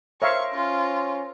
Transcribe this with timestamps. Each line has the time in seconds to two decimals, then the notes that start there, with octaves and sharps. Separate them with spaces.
0.22 A#4 C5 C#5 E5 F5 C#6 E6
0.54 C#4 F4